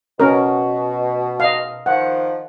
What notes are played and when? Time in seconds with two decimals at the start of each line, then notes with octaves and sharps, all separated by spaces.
0.20 B2 C#4 A#4
1.40 D#5 F5
1.86 D#3 F3 F#5